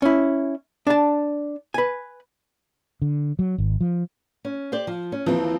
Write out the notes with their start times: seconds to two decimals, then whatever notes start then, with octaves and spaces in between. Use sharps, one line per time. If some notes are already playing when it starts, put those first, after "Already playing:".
0.02 C#4 E4
0.87 D4 A5
1.74 B4 G#5
3.02 D3
3.39 F#3
3.58 G#1
3.81 F3
4.45 C#4
4.72 G4 C5 D5
4.87 F3
5.12 C#4
5.26 D#2 E3 F3 C4